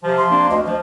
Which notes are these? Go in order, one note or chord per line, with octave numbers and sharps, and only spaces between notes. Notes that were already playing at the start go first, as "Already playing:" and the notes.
C3 F3
C6
A#3 C4 D4
D2 D#5
F3 D#5